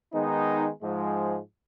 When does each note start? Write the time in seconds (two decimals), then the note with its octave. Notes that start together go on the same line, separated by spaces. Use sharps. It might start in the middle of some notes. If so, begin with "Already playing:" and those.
0.13 D#3 G#3 B3 D#4
0.83 G#2 F3 G#3